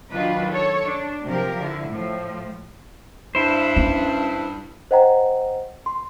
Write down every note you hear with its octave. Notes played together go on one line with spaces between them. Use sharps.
D#3 F#3 D4 D#4 F4 B4
A4 C#5
D4
C3 F3 G4 A#4
D3 E4
A2 F3
G2 E4 C5
C#4
C5 D#5 F#5 G5 A#5
C6